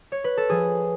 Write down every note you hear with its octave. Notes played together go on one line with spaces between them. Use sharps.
C#5
B4
A4
F3 G#4